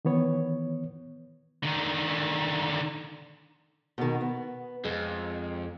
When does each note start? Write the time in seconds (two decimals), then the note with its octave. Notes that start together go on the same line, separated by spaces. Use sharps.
0.05 D#3 E3 B3 C#5
1.63 D3 D#3
3.98 B2 D#3
4.21 B3
4.85 F2 G#3